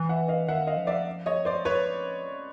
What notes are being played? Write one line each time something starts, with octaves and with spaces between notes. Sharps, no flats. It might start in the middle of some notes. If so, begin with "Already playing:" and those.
Already playing: E3
E5 F#5
D#5 F5
D#3 E5 F#5
D#5 F5
F3
D5 E5
C#5 D#5
C5 D5
B4 C#5